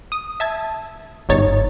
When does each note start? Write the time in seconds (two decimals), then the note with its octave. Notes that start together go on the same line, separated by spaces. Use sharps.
0.12 D#6
0.40 E5 A5 G#6
1.29 G1 G#2 D#4 C#5 A6